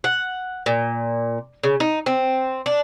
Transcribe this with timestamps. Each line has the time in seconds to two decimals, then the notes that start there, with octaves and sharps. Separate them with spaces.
0.04 F#5
0.66 A#2
1.63 C#3
1.80 D#4
2.06 C4
2.66 D4